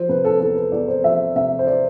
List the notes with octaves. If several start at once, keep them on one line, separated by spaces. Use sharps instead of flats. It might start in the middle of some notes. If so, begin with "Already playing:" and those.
Already playing: F3 C5
C3 B4
A4
E2 A4
B4
E2 D5
C5
F3 E5
C3 E5
C5
D5